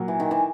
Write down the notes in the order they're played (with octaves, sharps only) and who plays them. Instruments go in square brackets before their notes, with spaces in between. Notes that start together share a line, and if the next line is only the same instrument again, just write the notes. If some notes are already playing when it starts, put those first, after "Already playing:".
Already playing: [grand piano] A#2 F#3 A#3
[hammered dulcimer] E3
D#3
E3